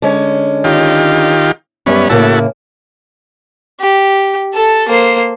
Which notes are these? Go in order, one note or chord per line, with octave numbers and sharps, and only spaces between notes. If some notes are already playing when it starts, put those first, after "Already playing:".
D3 G#3 C#4
D#3 F4 G4
F#2 G3 B3 C#4
A2 C#3 A#3 E4 F#4 A4
G4
A4 A5
A#3 C5